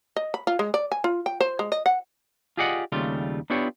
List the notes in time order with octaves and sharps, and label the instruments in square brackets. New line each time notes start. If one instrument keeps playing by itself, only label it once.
[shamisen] D#5
B5
F4
G#3
D5
G#5
F4
G5
C5
G#3
D#5
F#5
[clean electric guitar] F4 G4 G#4 D5 D#5 F#5
D#2 C#3 G3 A3 C4 F4
B3 D4 E4 F4 G4 C#5